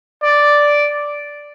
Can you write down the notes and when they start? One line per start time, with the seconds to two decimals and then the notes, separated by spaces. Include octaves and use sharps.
0.23 D5